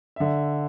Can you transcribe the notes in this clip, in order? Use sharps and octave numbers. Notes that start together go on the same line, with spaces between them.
D3 E5